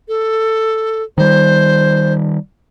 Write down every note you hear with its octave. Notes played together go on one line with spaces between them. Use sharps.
A4
D#3 G3 C5